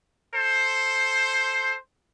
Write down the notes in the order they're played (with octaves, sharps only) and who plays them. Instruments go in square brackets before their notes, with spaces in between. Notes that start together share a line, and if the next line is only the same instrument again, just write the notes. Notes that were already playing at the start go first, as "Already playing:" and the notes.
[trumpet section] A4 C5